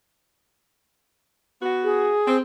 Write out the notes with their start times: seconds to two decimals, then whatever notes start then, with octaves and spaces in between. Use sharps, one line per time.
1.62 B3 F#4
1.84 G#4
2.27 C4